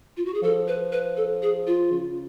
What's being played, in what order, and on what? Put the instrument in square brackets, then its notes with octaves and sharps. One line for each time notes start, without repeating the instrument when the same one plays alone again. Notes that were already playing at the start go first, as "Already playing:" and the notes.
[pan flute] F4
F#4
G#4
[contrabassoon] F3 [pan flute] A4
[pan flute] B4
B4
A4
G#4
F4
[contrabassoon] C#3